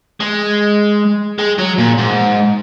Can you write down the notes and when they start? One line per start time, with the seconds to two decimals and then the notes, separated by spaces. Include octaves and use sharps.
0.20 G#3
1.38 G#3
1.58 F#3
1.78 A#2
1.98 G#2